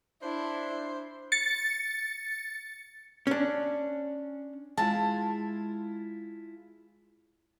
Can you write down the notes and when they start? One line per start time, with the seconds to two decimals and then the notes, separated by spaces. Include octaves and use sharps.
0.22 D4 E4 C5
1.32 A6 C#7
3.27 C#4 D4
4.78 G#3 E4 F4 A5